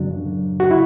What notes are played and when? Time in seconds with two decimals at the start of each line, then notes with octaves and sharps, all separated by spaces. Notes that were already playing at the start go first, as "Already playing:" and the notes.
Already playing: F#2 C#3 F#3 D4
0.60 F#4
0.71 E4